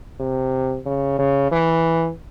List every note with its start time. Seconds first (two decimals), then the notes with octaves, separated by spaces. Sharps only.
0.20 C3
0.86 C#3
1.19 C#3
1.52 E3